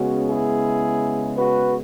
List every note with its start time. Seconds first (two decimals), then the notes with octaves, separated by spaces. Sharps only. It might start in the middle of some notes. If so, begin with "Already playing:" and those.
Already playing: C#3 G#3 B3 C#4 F#4
0.29 E4 G#4
1.35 F#4 B4